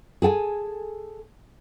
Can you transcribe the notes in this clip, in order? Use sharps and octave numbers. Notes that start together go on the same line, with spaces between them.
G#4 A4 G5 G#5